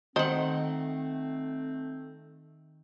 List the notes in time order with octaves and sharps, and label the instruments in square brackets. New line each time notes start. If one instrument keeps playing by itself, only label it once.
[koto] D#3 F#5 [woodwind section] A3 C4 [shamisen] C5 D#5